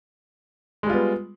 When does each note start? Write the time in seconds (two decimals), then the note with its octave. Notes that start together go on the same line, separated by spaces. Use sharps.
0.83 G#3
0.86 G3
0.90 F4
0.93 B3